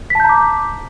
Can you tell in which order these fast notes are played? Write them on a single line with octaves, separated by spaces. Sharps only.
B6 A5 G6 A#5 D6